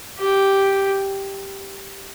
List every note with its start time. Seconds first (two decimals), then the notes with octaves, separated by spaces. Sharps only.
0.18 G4